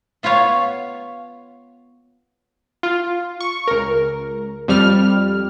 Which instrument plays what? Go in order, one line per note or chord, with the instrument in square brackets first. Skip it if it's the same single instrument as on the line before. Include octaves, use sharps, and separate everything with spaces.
[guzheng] B3 F4 B4 C#5 F5
[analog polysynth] F4
C#6
C#2 A#4
F2 G3 F6